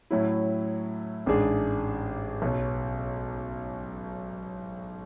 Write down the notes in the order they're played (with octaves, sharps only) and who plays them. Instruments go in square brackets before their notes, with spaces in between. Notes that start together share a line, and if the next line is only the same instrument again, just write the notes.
[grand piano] A2 F#3 C#4 E4
A1 G#2 G#3 D4 G#4
B1 B2 F#3 C#4